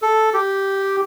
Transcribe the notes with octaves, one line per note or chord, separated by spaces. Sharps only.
A4
G4